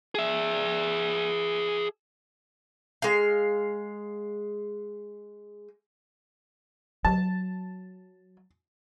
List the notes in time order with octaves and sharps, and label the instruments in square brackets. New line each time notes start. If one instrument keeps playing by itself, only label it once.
[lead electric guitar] G#4 E5
[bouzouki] G#3 F5
[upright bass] F#3 [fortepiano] A5